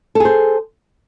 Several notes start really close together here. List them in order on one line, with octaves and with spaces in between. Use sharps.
A4 G#4 C5